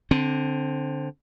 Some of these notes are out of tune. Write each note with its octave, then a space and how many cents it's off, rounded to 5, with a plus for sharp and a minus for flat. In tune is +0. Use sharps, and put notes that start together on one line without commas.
D3 +0 C4 +10